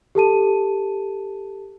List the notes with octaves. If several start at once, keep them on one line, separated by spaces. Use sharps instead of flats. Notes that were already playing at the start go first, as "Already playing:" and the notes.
G4 A4 A5 D#7